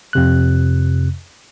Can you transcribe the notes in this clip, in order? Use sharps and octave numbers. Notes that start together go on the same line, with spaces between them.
F2 C3 F#6